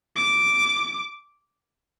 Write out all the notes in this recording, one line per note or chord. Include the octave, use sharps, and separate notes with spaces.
D6